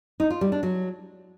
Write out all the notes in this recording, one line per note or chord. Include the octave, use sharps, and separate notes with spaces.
D#4
F4
G3
D4
F#3